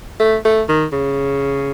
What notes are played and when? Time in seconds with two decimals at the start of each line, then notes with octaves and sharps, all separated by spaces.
0.20 A3
0.45 A3
0.69 D#3
0.93 C#3